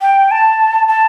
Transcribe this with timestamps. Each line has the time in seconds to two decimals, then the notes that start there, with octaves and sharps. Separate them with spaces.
0.01 G5
0.31 A5
0.88 A5